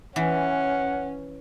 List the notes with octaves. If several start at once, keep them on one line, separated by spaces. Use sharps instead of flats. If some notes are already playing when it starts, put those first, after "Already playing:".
E3 C#4 F#5